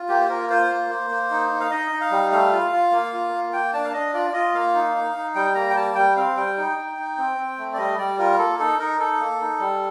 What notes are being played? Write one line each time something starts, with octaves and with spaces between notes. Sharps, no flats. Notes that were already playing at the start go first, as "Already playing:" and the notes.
Already playing: F4
A#3 G4
C5
F4 A#4
F4 C5
A#3
A#3
A#3
D#4
D#4
F5
D#4 D#5
D#4
F5
G3
A3 F5
F4
F4
A#3
F4
A#3
A#3 G5
D4 A5
F5
D4 D#5
F4 D5
F4 D#5
A#3 F5
D#4
D#4
D#4
G3 G5
A#3 A#5
G5
G3 A5
G3 G5
C4 F5
G3 G5
D#4
D#4
D#4
C4
C4
A3
D5
G3 D#5
G3 D5
F4 A#4
A#3 A4
D#4 A4
D#4 A#4
D#4 A4
A#3
D#4
G3